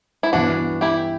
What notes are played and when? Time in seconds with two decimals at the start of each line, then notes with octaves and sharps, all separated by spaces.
0.23 E4
0.33 G2 E3 B3 D4 F#4
0.81 E4 G4